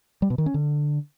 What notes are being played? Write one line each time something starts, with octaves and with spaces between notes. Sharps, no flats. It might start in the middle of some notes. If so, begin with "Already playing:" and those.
G3
B2
D#3
C#4
D3